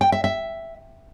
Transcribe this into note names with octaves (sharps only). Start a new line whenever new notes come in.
G5
E5
E5